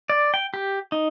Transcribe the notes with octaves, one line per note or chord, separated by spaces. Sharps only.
D5
G5
G4
D#4